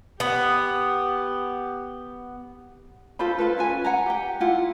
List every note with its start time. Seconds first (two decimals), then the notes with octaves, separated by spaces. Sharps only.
0.20 B3 G4
3.19 F4 A4 C5 B5
3.38 F4 A4 B4
3.57 C#4 B4 G#5
3.84 F#5 G#5 A#5
4.06 G4 G5
4.40 E4 F4 F#5